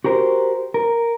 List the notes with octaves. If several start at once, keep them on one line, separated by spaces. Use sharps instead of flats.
F#4 G4 A#4 C5
A#4